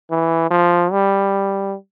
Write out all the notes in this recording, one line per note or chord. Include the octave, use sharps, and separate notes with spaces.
E3
F3
G3